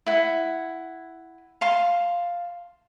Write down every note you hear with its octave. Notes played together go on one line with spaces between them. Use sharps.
E4 F#5
F5 A5 C6